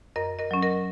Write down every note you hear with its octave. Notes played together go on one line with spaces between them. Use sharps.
F#2 A#4 D#5
A#4 D#5
F#3 C#4
A#4 D#5